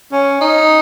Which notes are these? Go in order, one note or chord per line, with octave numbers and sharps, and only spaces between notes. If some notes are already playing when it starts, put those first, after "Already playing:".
C#4
D#4